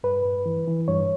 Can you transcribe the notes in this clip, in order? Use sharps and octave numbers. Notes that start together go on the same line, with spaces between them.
G2 B4
G2
E3
E3
G2 C#5